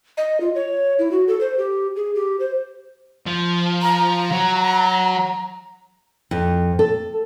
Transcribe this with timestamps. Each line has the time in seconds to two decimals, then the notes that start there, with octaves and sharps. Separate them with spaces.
0.17 D#5
0.41 F4
0.55 C#5
0.99 E4
1.11 F#4
1.28 A4
1.41 C5
1.58 G4
1.96 G#4
2.15 G4
2.40 C5
3.27 F3
3.82 A#5
4.31 F#3
6.31 F2
6.79 A4